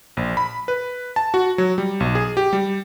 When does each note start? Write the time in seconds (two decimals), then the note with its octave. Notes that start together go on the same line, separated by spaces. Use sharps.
0.17 A#1
0.37 B5
0.68 B4
1.16 A5
1.34 F#4
1.58 F#3
1.78 G3
2.00 B1
2.15 G#4
2.37 G4
2.53 G3